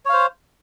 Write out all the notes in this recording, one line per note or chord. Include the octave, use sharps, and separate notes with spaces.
C5 C#5 F5